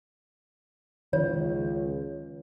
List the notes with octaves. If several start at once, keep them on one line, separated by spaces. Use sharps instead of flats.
C#2 D#3 F3 C#5